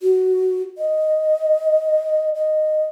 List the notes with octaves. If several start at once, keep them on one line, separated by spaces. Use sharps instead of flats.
F#4
D#5
D#5